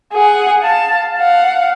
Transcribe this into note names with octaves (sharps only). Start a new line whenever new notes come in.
G#4 F#5
F5 A5
F5 F#5